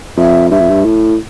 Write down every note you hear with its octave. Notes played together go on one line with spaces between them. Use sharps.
F2 E5
G2 E5
F2
G2
A2